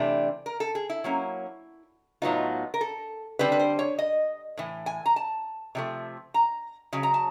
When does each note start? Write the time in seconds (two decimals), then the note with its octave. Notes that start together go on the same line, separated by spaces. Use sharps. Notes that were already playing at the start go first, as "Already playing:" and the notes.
Already playing: C3 E3 A3 D4
0.46 A#4
0.60 A4
0.75 G#4
0.90 E4
1.04 F#3 A#3 C#4
2.22 A2 F#3 B3 D#4 F4
2.74 A#4
2.81 A4
3.39 D3 G3 C4 B4
3.52 B4
3.59 C5
3.79 C#5
3.99 D#5
4.58 A2 E3
4.86 G#5
5.06 A#5
5.16 A5
5.75 C3 F3 A3
6.34 A#5
6.93 C#3 F#3
7.03 A#5
7.14 A5